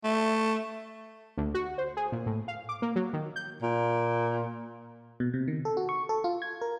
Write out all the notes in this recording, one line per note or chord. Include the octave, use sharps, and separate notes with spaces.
A3
D2
F#4
C5
G#4
A#2
A2
F5
D6
A#3
F#3
D#3
G6
A#2
B2
C3
D#3
A4
F#4
C#6
A4
F4
G#6
A#4